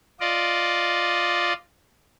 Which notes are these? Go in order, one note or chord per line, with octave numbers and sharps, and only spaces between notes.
F4 D5 D#5